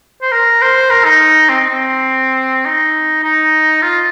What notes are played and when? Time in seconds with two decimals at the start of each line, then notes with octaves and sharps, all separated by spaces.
0.22 C5
0.32 A#4
0.61 C5
0.90 A#4
1.04 D#4
1.49 C4
1.69 C4
2.65 D#4
3.23 D#4
3.82 F4